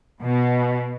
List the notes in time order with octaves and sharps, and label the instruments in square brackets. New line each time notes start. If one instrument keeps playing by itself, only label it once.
[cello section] B2